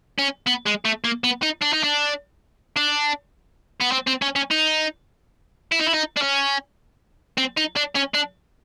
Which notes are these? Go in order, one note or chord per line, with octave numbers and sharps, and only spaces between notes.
C#4
B3
G#3
A3
A#3
B3
D#4
D4
D#4
D4
D4
B3
C4
C4
C#4
C#4
D#4
E4
D#4
E4
D#4
D4
C#4
C4
D#4
D4
C#4
D4